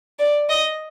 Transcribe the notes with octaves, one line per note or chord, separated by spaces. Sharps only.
D5
D#5